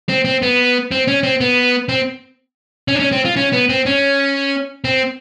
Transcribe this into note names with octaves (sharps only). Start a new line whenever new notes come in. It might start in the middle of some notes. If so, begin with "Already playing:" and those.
C4
C4
B3
C4
C#4
C4
B3
C4
C#4
D4
C#4
C4
F4
C#4
B3
C4
C#4
C4